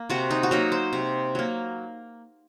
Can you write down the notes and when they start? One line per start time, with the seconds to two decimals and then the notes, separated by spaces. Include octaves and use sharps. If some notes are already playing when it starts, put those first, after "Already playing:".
Already playing: A#3
0.10 C3 F#4
0.31 D#4
0.43 F#4
0.51 F#3 A#3 D#4
0.72 C5
0.93 C3
1.35 F#3 A#3